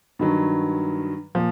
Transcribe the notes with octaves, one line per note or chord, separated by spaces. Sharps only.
G2 D#3 F#3
A#2 F3